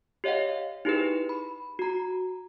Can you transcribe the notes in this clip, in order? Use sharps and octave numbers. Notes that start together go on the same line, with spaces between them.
G4 C#5 D#5 F5 F#5
D#4 E4 G4 G#4 B4
B5
F#4 A#5